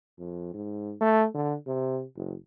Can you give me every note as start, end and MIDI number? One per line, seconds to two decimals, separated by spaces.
0.18 0.50 41
0.54 0.93 44
1.01 1.26 57
1.34 1.56 50
1.67 2.03 48
2.16 2.34 30